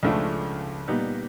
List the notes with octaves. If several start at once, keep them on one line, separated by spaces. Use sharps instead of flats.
C#2 C#3 F3 A3 D4
A#2 G3 B3 D#4